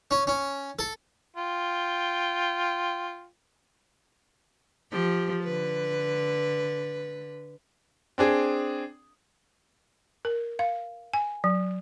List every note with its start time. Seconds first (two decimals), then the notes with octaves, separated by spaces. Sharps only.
0.11 C#4
0.27 C#4
0.79 A4
1.37 F4 G5
4.91 F3 G4
5.44 D3 B4
8.18 C4 D4 G#4
10.25 A#4
10.59 F5
11.13 G#5
11.44 F#3